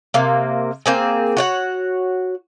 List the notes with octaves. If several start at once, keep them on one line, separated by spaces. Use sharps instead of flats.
C3 A#3
A#3 C4 G#4
F#4 C#5 F#5